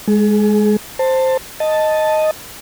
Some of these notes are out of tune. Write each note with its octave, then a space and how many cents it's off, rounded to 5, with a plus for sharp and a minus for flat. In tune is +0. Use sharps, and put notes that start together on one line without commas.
G#3 +0 G#4 +35
C5 +0 A5 +20
D#5 +0 A5 +0